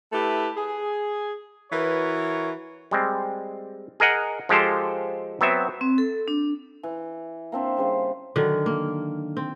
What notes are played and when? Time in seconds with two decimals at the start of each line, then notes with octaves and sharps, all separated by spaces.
0.12 A3 E4 G4 A4 B4
0.57 G#4
1.71 E3 F#4 A#4 B4 C#5
2.91 G3 G#3 C4
4.00 G#4 A#4 D#5 F#5
4.49 F3 G#3 G4 A4 C5
5.41 F#3 B3 C4 E5
5.81 C4
5.98 A4
6.28 D4
6.83 E3
7.52 A#3 C4 D4 E5
7.77 C#3 G3 C5
8.36 D3 D#3 F#3
8.66 A#3
9.37 C4